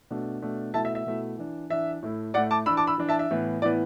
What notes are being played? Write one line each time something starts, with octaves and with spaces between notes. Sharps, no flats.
B2 A3 D4
B2 A3 D4
B2 A3 E4 E5 A5
E5
E5
B2 A3 E4
E3 D4
E3 D4 E5
A2 A3 E4
A2 A3 E4 D5 F#5
A5 D6
E3 D4 B5 E6
A5 D6
B5 E6
E3 D4
E5 A5
E5
A2 E3 B3
A2 E3 B3 D5